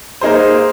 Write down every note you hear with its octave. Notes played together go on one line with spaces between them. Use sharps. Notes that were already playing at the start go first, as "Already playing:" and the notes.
A#3 D#4 G#4 C5